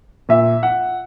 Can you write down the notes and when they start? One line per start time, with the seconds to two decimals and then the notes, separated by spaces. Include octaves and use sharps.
0.29 A#2 E5
0.63 F#5